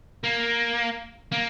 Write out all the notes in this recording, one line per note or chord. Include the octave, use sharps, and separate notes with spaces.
A#3
A#3